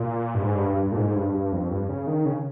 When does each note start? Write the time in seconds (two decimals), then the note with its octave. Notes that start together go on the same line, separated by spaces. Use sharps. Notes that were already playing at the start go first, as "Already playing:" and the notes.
Already playing: A#2
0.35 G2
0.42 G#2
0.55 G2
0.69 G2
0.83 G2
0.92 A#2
0.97 G#2
1.16 G2
1.34 G2
1.52 F2
1.71 G2
1.89 C#3
2.07 D#3
2.25 C#3